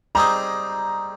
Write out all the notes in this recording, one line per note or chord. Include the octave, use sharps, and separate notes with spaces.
G3 C4 D#4 G#4 A#5